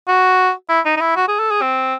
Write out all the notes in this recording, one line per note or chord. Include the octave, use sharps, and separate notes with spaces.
F#4
E4
D#4
D#4
E4
F#4
G#4
A4
G#4
C4